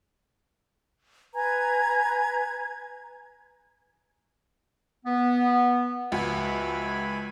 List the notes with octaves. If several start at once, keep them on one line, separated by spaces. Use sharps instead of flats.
B4 G#5 A#5 G#6
B3
C#2 F3 F#4 E5 G#5 B5